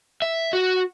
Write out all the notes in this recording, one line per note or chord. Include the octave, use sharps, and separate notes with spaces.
E5
F#4